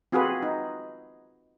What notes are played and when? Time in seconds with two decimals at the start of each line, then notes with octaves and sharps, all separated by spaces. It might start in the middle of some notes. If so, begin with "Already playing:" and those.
0.12 C4 F4 F#4 G#4 A4 B4
0.42 D#4